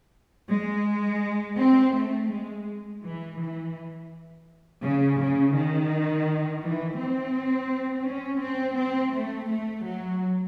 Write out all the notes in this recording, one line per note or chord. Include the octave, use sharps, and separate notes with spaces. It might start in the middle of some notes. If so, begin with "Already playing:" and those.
G#3
C4
A3
G#3
E3
E3
C#3
C#3
D#3
E3
C4
C#4
C4
C4
A3
A3
F#3